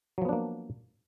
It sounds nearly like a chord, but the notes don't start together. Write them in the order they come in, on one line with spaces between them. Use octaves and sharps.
F#3 F3 B3 D4 A#3